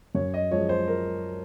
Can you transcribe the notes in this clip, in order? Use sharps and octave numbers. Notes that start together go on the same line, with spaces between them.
F#2 C#5
D#5
F3 G#3 C#5
C5
A#4